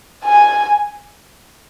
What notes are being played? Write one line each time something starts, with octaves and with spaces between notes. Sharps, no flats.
G#5